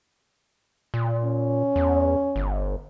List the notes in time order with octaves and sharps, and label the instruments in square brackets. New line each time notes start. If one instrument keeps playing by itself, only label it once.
[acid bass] A#2
[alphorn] C#4
[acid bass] E2
G1